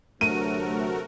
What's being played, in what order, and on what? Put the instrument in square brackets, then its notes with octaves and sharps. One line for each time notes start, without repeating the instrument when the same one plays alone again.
[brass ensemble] D2 C3 F#3 [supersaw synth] A3 F#4 A#4 [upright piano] D#7